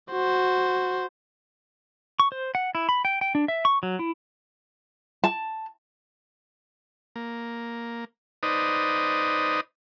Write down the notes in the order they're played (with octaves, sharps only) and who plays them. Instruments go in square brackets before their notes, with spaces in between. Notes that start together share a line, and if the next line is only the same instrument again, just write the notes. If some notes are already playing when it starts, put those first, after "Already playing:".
[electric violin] F#4 C5
[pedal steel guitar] C#6
C5
F#5
E4
B5
G5
G5
D4
E5
C#6
F#3
E4
[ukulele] A5
[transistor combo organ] A#3
D#4 B4 C5 D5 D#5